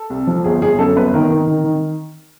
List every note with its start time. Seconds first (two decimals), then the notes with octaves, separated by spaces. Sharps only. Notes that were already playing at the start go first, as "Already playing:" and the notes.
Already playing: A4
0.10 C2
0.27 F3
0.44 G1 G#4
0.62 G1 G#4
0.78 F#2 A4
0.96 G1 B4
1.14 D#3 A#4
1.30 D#3
1.47 D#3
1.64 D#3